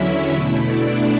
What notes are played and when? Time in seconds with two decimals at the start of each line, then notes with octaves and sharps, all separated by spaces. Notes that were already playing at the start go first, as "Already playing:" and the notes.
Already playing: E2 D3 F#3 C#4 E4 E5
0.32 B2 A3 E4
0.66 D4 D5